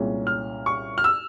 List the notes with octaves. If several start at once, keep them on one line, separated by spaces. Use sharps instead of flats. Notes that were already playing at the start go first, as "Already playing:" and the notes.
Already playing: C2 A#2 G#3 C#4
F6
C#6
F6
E6